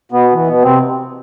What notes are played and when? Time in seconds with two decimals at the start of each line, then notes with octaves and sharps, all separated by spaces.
0.12 B2 B3
0.33 E3
0.47 B2 B3
0.63 C3 C4